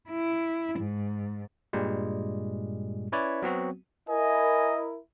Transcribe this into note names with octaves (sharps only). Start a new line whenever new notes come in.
E4
G#2
G2 A#2 G3 G#3
C#4 E4 B4 C#5 D5
F#3 B3 C4 F#4
E4 A#4 D#5 G#5